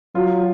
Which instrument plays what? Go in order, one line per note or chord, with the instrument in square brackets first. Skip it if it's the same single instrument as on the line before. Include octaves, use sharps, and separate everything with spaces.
[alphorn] F#3 [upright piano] F4